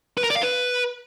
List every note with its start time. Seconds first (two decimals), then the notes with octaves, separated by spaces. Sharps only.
0.18 B4
0.24 A#4
0.30 D5
0.36 F5
0.43 B4